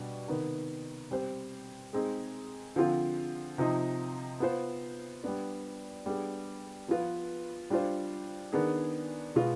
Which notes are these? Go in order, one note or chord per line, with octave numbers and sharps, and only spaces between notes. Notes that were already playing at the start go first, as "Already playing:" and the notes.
Already playing: B2 G3 D4
C3 D#3 B3
G3 C4 G4 C5
G#3 C4 D#4 G#4
D3 F3 C4 F4
C3 F3 C4 D#4
B3 F4 C5
G3 B3 D4
G3 B3 D4 G#4
F3 B3 F4 B4
G3 D4 F4 C5
D#3 B3 D4 G#4
B2 G#3 B3 F4